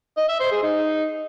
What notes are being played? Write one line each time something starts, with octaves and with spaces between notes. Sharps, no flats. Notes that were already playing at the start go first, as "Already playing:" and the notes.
D#5
E5
C5
G#4
D#4